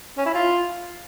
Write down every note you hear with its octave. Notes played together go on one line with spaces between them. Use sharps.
C#4
E4
F4